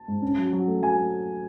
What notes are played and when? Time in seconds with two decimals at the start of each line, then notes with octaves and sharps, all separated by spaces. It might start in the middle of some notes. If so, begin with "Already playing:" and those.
Already playing: A5
0.08 G#2
0.22 C#4
0.38 F#3
0.53 F#3
0.68 A3
0.82 F#3 G#5
0.97 A3